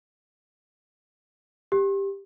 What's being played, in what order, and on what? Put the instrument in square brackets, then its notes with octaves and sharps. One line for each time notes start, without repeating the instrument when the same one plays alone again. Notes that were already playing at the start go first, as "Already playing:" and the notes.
[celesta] G4